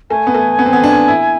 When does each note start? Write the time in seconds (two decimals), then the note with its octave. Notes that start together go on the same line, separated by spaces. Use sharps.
0.10 A3 G#5
0.27 B3
0.35 A3
0.59 B3
0.66 C4
0.73 B3
0.84 D4
1.08 E4